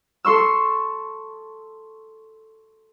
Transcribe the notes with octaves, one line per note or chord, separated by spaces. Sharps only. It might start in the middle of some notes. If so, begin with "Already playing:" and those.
A4 C6 C#6 E6